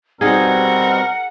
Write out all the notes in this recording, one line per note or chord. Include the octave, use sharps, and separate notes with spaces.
B2 G3 C4 D#4 G#4 A#4 F#5